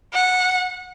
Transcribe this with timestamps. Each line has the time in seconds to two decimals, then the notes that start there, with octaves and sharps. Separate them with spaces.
0.13 F#5